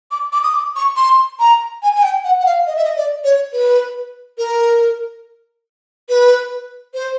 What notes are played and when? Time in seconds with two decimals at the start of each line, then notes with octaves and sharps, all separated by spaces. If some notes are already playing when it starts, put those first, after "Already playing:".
0.11 D6
0.32 D6
0.43 D#6
0.54 D6
0.76 C#6
0.97 C6
1.39 A#5
1.83 G#5
1.96 G#5
2.03 G5
2.24 F#5
2.40 F#5
2.46 F5
2.67 D#5
2.76 E5
2.85 D#5
2.96 D5
3.24 C#5
3.53 B4
4.38 A#4
6.09 B4
6.94 C5